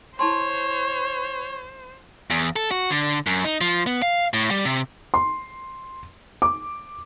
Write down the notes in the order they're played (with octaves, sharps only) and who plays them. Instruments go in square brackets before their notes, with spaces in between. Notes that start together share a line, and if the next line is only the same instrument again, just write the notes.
[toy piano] E4 A5 C6 [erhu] C5 [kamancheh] C#5
[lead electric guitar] E2
A4
F#4
D3
F#2
D#4
F3
B3
F5
A2
G3
C3
[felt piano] C6
D6